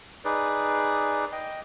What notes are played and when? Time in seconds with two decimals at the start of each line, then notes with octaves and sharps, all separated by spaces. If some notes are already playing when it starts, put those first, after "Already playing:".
0.25 D#4 G#4 B4 D5
1.32 D#5 G5